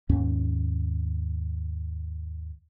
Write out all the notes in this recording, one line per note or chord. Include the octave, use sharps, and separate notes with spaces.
D#2 G#2 C#4